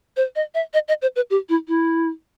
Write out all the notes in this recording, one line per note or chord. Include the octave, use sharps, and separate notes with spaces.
C5
D#5
E5
D#5
D#5
C5
B4
G4
E4
E4